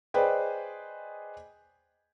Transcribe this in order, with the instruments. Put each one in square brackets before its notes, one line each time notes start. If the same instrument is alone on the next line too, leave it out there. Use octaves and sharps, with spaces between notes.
[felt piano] G#4 B4 C5 D5 D#5 G5